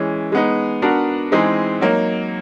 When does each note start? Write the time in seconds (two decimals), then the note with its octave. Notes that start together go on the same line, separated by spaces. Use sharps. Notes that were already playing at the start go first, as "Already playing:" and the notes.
Already playing: E3 G#3 C#4
0.32 G#3 B3 D#4
0.82 B3 D4 F#4 A#4
1.32 E3 G#3 C4 D#4 G#4
1.81 F#3 A#3 D#4